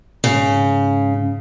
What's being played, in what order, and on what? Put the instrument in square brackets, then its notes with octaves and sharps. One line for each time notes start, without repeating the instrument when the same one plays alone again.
[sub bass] G#2 [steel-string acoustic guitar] C#3